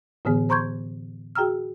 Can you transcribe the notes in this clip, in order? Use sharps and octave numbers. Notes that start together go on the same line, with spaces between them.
A2 D3 E3 B3 G#4
C5 A#5 C6 C#6 G6 G#6
F#4 G#4 G5 A#5 E6 F6